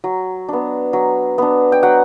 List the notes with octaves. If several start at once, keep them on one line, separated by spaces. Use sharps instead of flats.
F#3
B3 D4
F#3
B3 D4
G5
F#3 F#5